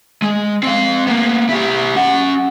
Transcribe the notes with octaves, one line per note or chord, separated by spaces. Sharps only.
G#3
C4 F5
A#3 B3
E4 G4
C#4 F#5